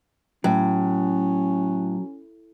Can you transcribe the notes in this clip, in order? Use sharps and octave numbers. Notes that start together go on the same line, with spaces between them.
A2 F#3 C#4